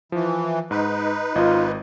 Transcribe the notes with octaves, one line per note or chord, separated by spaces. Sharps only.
E3 F3
G#2 D#4 B4
G#1 F4 D#5